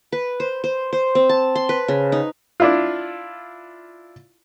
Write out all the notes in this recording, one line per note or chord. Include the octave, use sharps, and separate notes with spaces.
B4
C5
C5
C5
C4
A5
C6
B4
C#3
D#4
D4 E4 F4